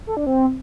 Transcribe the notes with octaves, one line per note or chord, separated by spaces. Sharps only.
A4
D4
C4